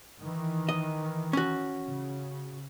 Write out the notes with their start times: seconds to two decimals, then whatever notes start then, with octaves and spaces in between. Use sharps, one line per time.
0.19 D#3 E3
0.69 D#5
1.33 C#4 F#4
1.87 C#3